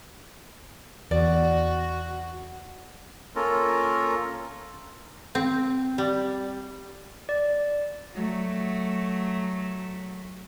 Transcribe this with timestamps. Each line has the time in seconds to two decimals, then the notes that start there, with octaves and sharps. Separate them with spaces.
1.11 E2 F#4 D5
3.36 A#3 C#4 F4 A4 A#4
5.35 C4
5.98 G3
7.29 D5
8.13 F#3 A3